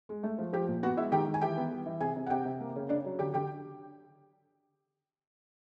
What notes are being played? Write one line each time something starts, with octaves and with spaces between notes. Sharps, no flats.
G#3
A3
F3
F3 G4 G5
A#2
B3 F#4 F#5
G#3 E4 E5
D#3 G4 G5
D#3
G#5
E3 G4 G5
B3
G3
E3
C3 G#4 G#5
C3
F#5
C3 G4 G5
C3
A#3
C#3
C#3 D4 D5
F#3
D3 G4 G5
D3 G4 G5